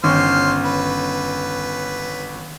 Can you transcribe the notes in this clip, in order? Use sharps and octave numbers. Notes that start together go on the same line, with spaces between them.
G1 D#3 C#4 C5 C#6 F6
B4